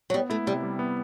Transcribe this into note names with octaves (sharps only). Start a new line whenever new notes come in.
F#3
G3 B3
A3 E4
C3 G3
G3
B3